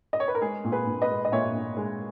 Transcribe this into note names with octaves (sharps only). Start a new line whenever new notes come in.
D#5
C#5
B4
A#4
G#3 G#4
A#2
G#4 B4
A#2
B4 D#5
G#3
D#5
A#2 C#5 E5
A#2
G#3